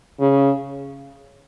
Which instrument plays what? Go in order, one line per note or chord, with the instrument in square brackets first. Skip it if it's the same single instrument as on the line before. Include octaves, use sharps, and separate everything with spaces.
[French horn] C#3